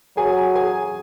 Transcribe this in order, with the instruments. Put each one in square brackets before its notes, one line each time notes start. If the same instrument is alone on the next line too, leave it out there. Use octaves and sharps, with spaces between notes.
[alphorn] F#3 [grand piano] G#4 G#5
[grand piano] G#4 G#5